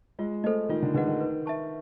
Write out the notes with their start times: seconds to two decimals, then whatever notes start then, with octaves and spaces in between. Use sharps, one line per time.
0.19 G#3 F4
0.44 A3 A4 C5 D#5
0.69 D#3 F4
0.82 D3
0.94 D3 G#4 B4 D#5 F#5
1.07 D#3
1.20 B4
1.46 E5 A5 C#6